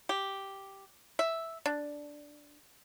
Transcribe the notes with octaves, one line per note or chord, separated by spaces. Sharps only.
G4
E5
D4